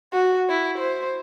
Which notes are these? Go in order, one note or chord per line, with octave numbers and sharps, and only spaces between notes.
F#4
E4
C5